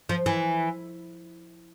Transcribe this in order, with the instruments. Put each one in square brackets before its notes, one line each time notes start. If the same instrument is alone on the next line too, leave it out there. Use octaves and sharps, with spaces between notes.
[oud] F3
E3